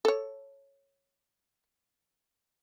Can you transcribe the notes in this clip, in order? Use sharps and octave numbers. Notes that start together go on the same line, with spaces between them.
A4 C#5